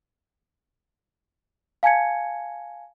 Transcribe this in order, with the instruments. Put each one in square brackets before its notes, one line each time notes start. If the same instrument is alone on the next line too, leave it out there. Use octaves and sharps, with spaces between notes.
[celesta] F5 G#5 A5 G#6 C#7